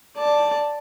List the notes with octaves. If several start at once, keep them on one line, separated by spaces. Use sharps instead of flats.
D5 A5